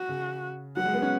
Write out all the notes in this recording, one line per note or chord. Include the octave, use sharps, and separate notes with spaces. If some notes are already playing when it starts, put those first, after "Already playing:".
Already playing: F#4
C#3
F#3 F#5
G#3
B3
C#4